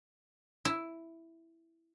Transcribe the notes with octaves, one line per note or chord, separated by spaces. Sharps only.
E4